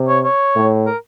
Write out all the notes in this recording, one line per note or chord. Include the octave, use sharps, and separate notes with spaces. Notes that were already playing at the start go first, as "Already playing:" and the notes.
Already playing: C3
C#5
C#5
A2
A#4